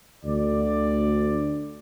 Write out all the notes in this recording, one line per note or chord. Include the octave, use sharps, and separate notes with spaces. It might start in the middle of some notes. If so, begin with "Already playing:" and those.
D2 D5